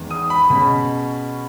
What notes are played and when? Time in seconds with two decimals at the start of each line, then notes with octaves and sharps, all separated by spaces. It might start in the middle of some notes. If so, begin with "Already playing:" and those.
Already playing: E2 D#3 G#3 B3
0.11 D#6
0.30 B5
0.50 B2 G#3 C#4 B5